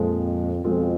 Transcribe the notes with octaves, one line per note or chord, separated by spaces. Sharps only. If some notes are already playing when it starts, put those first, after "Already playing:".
Already playing: F2 A#2 F3 G#3
F2 B2 G#3 C4 F4